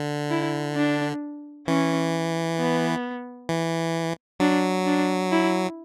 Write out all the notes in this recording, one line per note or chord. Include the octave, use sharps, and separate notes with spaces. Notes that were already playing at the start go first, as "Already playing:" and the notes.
Already playing: D3
E4
D4
E3 C#4
B3
E3
F#3 D4
D4
E4